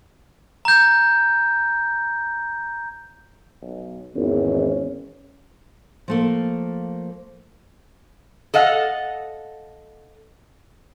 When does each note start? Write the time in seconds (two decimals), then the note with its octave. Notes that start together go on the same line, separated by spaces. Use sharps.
0.65 A#5 G6
3.62 B1
4.16 G#1 E2 C#4
6.08 F3 A3 A#3
8.54 A4 D#5 F5 F#5